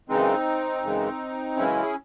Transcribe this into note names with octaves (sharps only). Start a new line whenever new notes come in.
F#2 C#3 E3 G#3 C4 D#4
F#2 C#3 E3 G#3
F#2 C#3 E3 G#3 C#4 E4
G#4